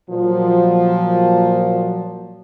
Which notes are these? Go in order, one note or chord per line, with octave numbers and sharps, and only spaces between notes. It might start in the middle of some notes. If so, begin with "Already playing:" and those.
A#2 F3 F#3